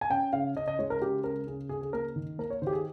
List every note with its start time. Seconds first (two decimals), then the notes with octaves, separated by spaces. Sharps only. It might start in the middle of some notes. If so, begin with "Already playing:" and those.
0.01 G#5
0.10 C#4 G5
0.33 C#3 F5
0.56 C#3 D#5
0.68 D#5
0.79 G#3 C#5
0.90 A#4
1.02 C#3 G4
1.24 C#3 A#4
1.47 C#3 G#4
1.69 C#3 G#4
1.81 G#4
1.93 A#3 A#4
2.16 D#3
2.38 A#3 A#4
2.50 C#5
2.62 D#3 C5
2.67 G4
2.73 G#4